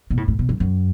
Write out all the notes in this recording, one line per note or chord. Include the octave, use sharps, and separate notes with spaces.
B2
A2
A2
B2
F#2
F#2